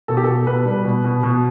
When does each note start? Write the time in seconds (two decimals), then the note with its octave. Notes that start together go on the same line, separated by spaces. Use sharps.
0.08 B2 A4
0.17 G4
0.24 B2 A4
0.47 B2 B4
0.66 G3
0.85 B2
1.04 B2
1.23 B2